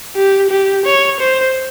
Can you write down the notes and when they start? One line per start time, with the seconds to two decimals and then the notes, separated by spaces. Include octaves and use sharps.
0.16 G4
0.50 G4
0.85 C#5
1.20 C5